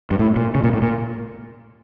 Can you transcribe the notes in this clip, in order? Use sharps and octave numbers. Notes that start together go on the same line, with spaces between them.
G2
A2
A#2
C#3
A#2
A2
A#2